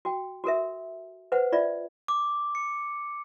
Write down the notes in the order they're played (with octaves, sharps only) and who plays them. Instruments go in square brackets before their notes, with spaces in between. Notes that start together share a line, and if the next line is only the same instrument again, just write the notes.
[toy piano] F#4 G5
F#4 A4 A#4 E5
B4 C5 F#5
F4 D5 E5
[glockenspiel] D6
C#7